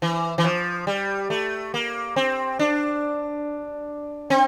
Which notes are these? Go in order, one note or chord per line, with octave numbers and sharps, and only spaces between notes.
E3
E3
F3
G3
A3
A#3
C4
D4
C4